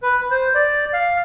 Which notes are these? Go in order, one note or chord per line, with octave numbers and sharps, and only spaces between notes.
B4
C5
D5
F5